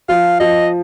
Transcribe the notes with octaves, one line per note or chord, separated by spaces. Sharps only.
F3 F5
F3 D#5